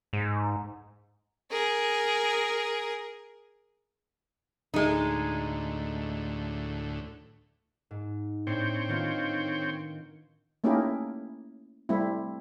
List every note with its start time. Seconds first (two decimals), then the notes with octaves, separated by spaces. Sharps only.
0.13 G#2
1.51 G#4 A#4
4.74 D2 A2 G#3 D#4
7.91 G#2
8.47 A2 C4 D4 C5 C#5 G5
8.88 D#3 B3 F4
10.64 A3 A#3 C#4 D#4 E4 G4
11.89 G3 A3 C4 E4